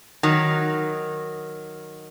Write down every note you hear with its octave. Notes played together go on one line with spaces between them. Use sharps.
D#3 F#3